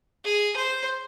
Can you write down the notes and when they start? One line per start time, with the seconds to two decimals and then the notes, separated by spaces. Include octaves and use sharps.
0.24 G#4
0.56 C5